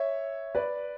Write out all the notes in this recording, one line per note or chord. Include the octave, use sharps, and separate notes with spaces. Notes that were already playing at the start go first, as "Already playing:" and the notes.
Already playing: C#5 E5
B4 D5